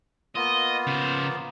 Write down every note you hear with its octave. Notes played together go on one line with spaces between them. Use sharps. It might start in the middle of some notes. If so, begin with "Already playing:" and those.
A#3 B3 F4 D#5
C#3 C5